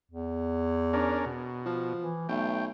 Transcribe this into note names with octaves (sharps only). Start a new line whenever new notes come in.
E2
C#4 D4 A#4
B2
F3
E3
B1 A3 G5